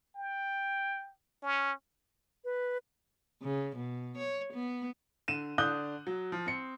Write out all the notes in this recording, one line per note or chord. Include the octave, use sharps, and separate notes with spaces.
G5
C#4
B4
C#3
B2
C#5
B3
D3 D#7 E7
D3 D4 D#6 F#6 G6 G7
F#3
F3
C4 C#7